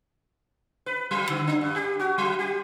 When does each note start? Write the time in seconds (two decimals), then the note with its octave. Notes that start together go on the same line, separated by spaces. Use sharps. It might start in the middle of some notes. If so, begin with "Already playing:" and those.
0.86 B4
1.11 F#3
1.29 D3
1.47 D4
1.61 G2
1.76 G4
1.99 F#4
2.18 F#3
2.39 G4